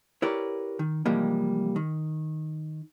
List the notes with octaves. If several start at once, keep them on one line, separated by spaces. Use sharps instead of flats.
E4 G4 A#4 B4 C#5 D5
D#3
C3 E3 F3 G3 G#3 A#3
D#3